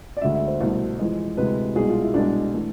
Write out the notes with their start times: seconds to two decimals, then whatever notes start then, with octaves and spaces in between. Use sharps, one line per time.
0.17 D5
0.21 D2 D3 G#3 E5
0.34 E5
0.48 C5
0.61 C2 B2 A3 C5
0.99 F2 E3 G#3
1.37 D2 C3 E3 G#3 B4
1.75 C2 B2 G#3 G#4
1.89 F4
2.02 E4
2.14 C2 B2 G#3 D4
2.53 E3 A3